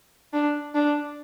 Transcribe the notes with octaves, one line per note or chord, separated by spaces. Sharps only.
D4
D4